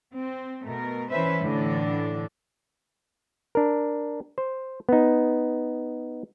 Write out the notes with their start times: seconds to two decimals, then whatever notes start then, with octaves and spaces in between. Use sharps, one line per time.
0.16 C4
0.65 B2 A3 A#4
1.11 E3 C#4 B4 C5 E5
1.43 A2 D3 E3 D4
3.55 D4 A#4
4.38 C5
4.89 B3 D#4